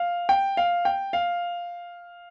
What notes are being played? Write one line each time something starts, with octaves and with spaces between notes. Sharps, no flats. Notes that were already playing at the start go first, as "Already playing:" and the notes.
Already playing: F5
G5
F5
G5
F5